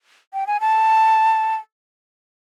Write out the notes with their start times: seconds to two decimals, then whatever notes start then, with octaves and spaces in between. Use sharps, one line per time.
0.34 G5
0.47 G#5
0.61 A5